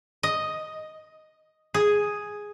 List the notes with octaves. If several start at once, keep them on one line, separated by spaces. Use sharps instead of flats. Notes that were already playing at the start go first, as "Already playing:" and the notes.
D#5
G#4